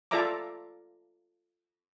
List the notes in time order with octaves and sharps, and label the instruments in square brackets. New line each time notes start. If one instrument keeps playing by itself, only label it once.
[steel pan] F4 A4 D5 E5 A#5 D6